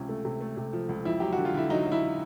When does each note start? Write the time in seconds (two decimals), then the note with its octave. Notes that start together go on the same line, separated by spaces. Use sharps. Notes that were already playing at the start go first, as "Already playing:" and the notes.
Already playing: C#2 C3 C#4
0.09 A3
0.25 C3
0.41 A3
0.57 C3
0.73 F3
0.89 C#2
1.05 F2 E4
1.20 F#3 G4
1.33 F#4
1.38 D3
1.45 F4
1.54 D3 E4
1.70 F#3 D#4
1.86 F#3
1.92 E4